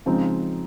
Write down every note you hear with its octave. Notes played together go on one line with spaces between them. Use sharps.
C#3 F3 G#3 C4 D#4